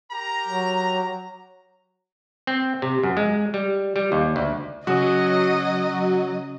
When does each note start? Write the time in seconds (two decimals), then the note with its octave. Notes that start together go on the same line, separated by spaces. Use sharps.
0.12 G4 A#4 A#5
0.48 F#3
2.47 C4
2.82 C3
3.03 F#2
3.17 G#3
3.54 G3
3.96 G3
4.12 D#2
4.36 D2
4.87 C#3 F#3 C#4 F#4 D#5 D#6